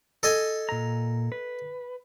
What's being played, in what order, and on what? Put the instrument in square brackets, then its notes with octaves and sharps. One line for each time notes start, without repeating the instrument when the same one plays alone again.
[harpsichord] A4 D#5 G#5
[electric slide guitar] A#2 A#5
B4